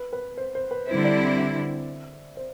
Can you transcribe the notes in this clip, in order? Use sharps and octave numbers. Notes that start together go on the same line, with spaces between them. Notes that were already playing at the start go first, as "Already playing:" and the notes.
Already playing: B4
B4
C5
C5
B4
D3 G3 C4 E4 C5
D5
E5
C5